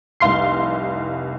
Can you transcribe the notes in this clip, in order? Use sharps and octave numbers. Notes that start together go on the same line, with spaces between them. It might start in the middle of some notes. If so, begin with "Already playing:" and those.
F1 C2 F5 C6 C7